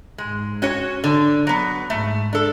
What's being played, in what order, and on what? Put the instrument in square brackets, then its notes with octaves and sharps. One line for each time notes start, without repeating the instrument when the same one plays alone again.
[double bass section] G#2 [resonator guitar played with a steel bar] G#3
[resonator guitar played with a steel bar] C#4 F#4 C#5
D3
F#3 B3
[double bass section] G#2 [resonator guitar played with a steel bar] A3
[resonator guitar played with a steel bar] D4 A4